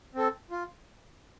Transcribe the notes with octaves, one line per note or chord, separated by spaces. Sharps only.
C4 A4
F4